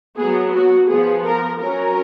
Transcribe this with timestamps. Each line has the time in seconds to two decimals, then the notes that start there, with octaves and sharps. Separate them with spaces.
0.17 F#3 B3 G#4
0.53 F#4
0.88 F3 B3 G#4
1.24 A#4
1.60 F#3 C#4 A#4